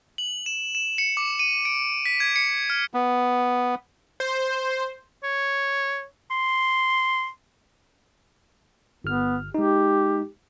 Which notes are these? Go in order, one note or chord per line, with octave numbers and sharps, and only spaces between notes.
F#7
E7
E7
C#7
D6
D#7
D7
B6
G#6
C#7
F6
B3
C5
C#5
C6
G1 B3 F6
G#3 D#4 G4